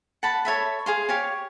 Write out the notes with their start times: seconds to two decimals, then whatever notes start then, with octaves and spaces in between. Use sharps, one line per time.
0.23 F#5 A5 B5
0.45 A4 C#5 E5 B5
0.86 G#4 F5 C6
1.09 G4 C#5 F5